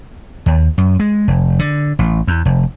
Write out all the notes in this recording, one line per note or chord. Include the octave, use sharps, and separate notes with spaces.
D#2
F#2
G#3
F1
D3
A1
E2
F1